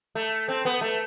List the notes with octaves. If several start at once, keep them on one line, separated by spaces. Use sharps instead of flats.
A3
C4
B3
A3